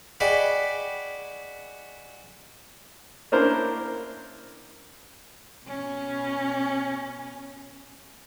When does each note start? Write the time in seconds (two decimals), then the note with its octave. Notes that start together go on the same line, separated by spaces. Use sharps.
0.20 F#4 G#4 D5 D#5 G5 B5
3.32 A#3 C#4 D4 E4 A#4 C5
5.66 B2 C#4